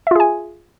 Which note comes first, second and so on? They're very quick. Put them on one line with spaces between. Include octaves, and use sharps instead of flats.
E5 F4 G#4 G#5